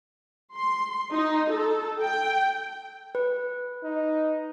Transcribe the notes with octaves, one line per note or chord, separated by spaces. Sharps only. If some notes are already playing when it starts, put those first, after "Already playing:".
C6
D#4
A4
G5
B4
D#4